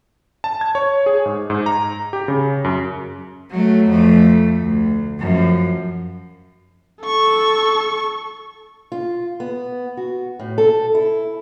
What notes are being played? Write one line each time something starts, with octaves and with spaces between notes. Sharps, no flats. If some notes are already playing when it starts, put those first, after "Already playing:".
A5
G#6
C#5
G#4
G#2
G#2
A#5
G4
C#3
F#2
F#3 A3
F2 A3
D2
F#2 F3
A4 C#6
F4
B3
F#4
A2
A4
E4